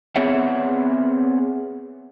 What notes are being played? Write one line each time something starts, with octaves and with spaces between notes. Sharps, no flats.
B3 C4 G#4 C#5 E5 F#5